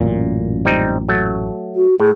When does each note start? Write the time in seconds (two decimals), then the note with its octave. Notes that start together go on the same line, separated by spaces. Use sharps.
0.01 A1 F#2 A#2
0.65 G3 C4 D#4
1.09 F#3 A3
1.76 F#4
2.00 A2 G#4